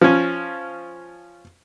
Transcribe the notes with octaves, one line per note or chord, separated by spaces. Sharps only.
F3 C#4